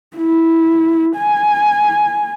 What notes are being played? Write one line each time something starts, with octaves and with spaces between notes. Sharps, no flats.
E4
G#5